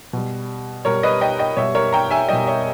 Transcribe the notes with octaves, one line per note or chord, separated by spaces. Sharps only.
B2 G3
B2 G3 A#4 C#5
B4 D#5
D#5 G5
D#5 G5
B2 G3 C#5 E5
A#4 C#5
G5 A#5
E5 G#5
B2 G3 D#5 G5
C#5 E5